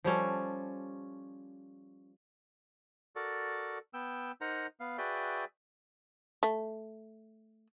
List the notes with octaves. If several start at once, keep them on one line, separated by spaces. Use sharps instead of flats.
F3 G3 C#4 A4
F#4 A4 A#4 D5
B3 G5 E6
D#4 A#4 C5 F#5 A#5
B3 F5
F#4 G#4 B4 D5 E5 G5
A3